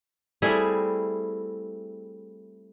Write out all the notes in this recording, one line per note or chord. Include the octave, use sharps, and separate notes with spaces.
G3 A3 C4 E4 G#4